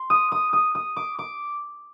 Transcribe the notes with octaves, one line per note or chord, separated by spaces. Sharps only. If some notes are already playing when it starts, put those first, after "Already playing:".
Already playing: C6
D#6
D#6
D#6
D#6
D6
D6